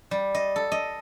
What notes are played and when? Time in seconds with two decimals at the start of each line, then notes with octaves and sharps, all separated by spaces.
0.11 G3
0.35 D#5
0.56 A4
0.72 D#5